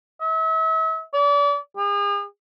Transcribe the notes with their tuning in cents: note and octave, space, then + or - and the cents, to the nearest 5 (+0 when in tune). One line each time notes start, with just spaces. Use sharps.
E5 -40
D5 -35
G#4 -40